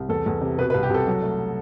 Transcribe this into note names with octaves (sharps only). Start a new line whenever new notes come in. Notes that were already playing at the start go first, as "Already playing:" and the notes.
Already playing: C2
E2 A4
E2
C3
B2 B4
B4
C2
G4
C2 A4
F#3
A3